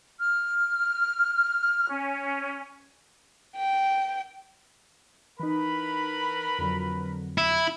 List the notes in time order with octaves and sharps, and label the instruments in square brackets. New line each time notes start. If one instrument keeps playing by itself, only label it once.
[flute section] F6
C#4
[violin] G5
[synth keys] E3 D#4 [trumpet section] A#4 B4 B5
[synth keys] F2 D3 F#3
[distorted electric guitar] E4